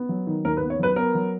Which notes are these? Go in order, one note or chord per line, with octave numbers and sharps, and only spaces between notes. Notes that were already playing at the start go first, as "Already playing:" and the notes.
Already playing: B3
F#3
D#3
D#2 A#4
B4
B3
C#5
F#3 B4
B3 A#4
F#3